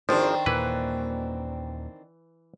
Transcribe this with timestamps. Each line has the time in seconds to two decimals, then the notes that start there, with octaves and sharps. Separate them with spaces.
0.09 G#1 D#3 F3 C4 D4 C5
0.46 D#2 A#2 E3 A#3 B4